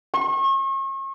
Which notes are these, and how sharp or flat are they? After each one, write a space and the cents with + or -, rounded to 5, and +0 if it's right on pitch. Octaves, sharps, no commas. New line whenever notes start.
C#6 -40